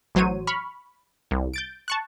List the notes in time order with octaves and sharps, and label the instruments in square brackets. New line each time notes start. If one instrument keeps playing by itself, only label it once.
[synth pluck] A1 F#3 C5 C#5 D#7
B5 C#6 F6
C2
G6 A6 D7
A5 C#6 F#6